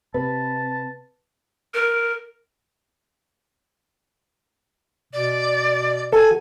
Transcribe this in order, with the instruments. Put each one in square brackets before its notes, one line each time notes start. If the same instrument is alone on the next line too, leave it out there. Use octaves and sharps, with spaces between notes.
[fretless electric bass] C3 [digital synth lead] B4 [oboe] A5
[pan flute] A#4
[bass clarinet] B2 [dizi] D5
[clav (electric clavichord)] A4 [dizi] G#5